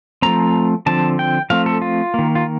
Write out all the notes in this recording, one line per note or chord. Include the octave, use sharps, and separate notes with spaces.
F3 A3 C4 A#5
D3 F3 C4 A5
G5
F3 A3 C4 F5
A4
F4
D#3 A#3
F4